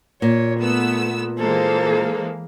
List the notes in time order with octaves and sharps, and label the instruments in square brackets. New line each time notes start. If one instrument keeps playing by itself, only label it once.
[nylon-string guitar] A#2 [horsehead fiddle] C#5
[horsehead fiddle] A3 [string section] B3 E6
[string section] E3 G#3 A#3 [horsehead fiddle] A4 C5